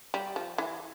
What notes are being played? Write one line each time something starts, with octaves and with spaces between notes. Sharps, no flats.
G3
F3
E3